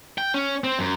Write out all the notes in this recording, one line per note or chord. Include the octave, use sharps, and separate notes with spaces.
G5
C#4
C4
F#2